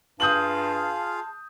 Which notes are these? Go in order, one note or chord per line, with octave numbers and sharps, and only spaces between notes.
G2 F4 G#4 F5 A5 D#6 G6 F#7